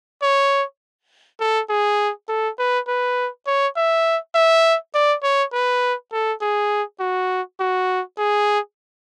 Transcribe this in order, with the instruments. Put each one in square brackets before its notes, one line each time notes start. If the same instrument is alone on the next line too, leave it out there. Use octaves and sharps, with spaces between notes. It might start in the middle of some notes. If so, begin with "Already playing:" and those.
[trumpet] C#5
A4
G#4
A4
B4
B4
C#5
E5
E5
D5
C#5
B4
A4
G#4
F#4
F#4
G#4